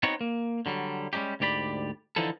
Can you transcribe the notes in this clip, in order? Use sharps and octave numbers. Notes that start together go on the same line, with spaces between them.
B3 C4 D#4 F#4 C#5 F#5
A#3
D3 F#3 G3
G3 G#3 C#4 D#4 G4
D2 G#2 G4 D5 B5
D3 E3 F3 D#4 E4 A4